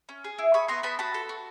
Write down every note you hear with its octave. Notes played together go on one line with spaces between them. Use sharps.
C#4
G#4
E4
G#4 B5 C#6
B3 A#5 C6
B3 A5 B5
F#4 A5 B5
A4
F#4